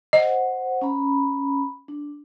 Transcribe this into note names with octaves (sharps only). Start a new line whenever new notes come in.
C5 D#5 F#5
C#4 A#5 B5
D4